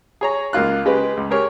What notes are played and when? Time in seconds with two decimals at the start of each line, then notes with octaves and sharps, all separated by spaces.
0.21 G#4 C#5 A#5
0.53 C#2 A#3 F4 F#6
0.85 C#3 G#3 G4 B4
1.17 C#2
1.30 G4 G#4 A#4 C#5